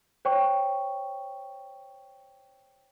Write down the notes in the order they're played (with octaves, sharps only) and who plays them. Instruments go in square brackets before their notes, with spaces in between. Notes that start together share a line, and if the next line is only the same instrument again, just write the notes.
[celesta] C5 C#5 G5 C#6